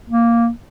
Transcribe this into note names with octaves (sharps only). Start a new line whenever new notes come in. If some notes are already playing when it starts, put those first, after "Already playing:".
A#3